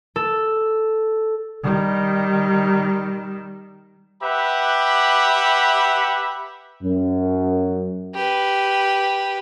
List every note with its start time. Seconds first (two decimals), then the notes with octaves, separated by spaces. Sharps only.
0.16 A4
1.63 D#3 G3
4.22 G4 B4 E5 F#5 B5
6.83 F#2
8.15 G4 B4